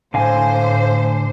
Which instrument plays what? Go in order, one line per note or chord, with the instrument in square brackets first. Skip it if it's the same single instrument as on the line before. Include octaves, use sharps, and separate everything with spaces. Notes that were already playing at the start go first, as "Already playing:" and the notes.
[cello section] A2 C5 [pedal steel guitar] D3 F5 G#5